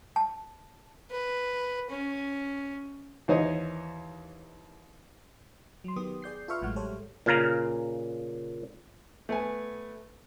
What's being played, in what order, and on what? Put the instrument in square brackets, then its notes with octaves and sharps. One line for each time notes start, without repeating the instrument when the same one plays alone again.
[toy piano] A5
[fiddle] B4
C#4
[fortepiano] D#2 E3 C5 C#5 D#5
[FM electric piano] F#3 C6
D#3 B3 G4 D#6
G#4 D5 G6 C7
F4 A4 B4 E5 C#6 F6
A1 A2 F#3 G#3 F#5 F6
G3 G4 A4 C5 C#5
[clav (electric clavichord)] A#2 C#3 F5 A#5
[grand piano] A3 B3 G#5